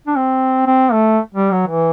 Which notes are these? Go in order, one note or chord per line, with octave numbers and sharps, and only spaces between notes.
D4
C4
C4
A3
G3
F#3
E3